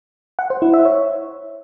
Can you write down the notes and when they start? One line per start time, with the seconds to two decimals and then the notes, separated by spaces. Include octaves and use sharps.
0.39 F#5
0.50 C5
0.62 E4
0.74 E5
0.85 C#5